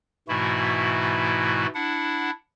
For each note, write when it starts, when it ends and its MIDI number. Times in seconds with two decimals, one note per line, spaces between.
0.28 1.66 44
0.28 1.66 47
0.28 1.66 52
0.28 1.66 57
0.28 1.66 64
0.28 1.66 66
1.75 2.30 62
1.75 2.30 64
1.75 2.30 78